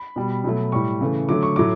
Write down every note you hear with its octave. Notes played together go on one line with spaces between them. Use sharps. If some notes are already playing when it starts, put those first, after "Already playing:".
Already playing: B5
B2 G3
B2 F#3 A3
A2 G3 C#6
C#3 E3 A3
D3 F#3 A3 D6
C#6
A2 F#3 A3 D6